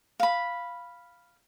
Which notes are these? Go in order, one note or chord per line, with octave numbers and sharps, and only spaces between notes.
F5 B5